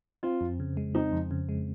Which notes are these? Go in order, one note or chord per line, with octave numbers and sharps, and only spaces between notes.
C4 F4
F2
C#3
G#3
C4 D#4
F2
C#3
G#3